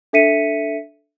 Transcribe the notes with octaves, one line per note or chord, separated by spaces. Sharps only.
D4 A4 E5 B6 C#7 D#7